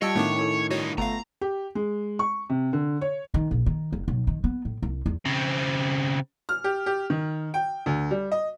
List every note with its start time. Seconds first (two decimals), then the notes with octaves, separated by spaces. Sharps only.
0.02 G3 F4 C#5 D#5 G5 A5 E6
0.16 A2 D#3 A3 B3 D4 D6
0.36 C#4 E4 A4
0.71 G2 D#4 F#4 C#5
0.98 G1 A3 B3 F4 F5 A#5
1.41 G4
1.75 G#3
2.19 C#6
2.50 C3
2.73 D3
3.01 C#5
3.34 D#3
3.51 A#1
3.66 D#3
3.93 F1
4.08 B1
4.27 D#3
4.44 B3
4.65 A2
4.82 C2
5.06 E2
5.25 C#3 C4
6.49 F6
6.64 G4
6.86 G4
7.10 D#3
7.54 G5
7.86 D2
8.11 G3
8.32 D#5